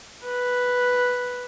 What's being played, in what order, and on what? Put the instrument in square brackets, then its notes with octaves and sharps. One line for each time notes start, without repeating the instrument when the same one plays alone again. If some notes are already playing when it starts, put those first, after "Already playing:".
[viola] B4